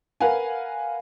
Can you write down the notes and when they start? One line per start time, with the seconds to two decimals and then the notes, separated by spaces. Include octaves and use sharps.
0.20 A#4 B4 F5 F#5 G#5